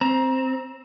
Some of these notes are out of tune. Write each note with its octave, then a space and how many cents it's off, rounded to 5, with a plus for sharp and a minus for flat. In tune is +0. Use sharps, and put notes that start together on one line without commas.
C4 +0 A#5 +25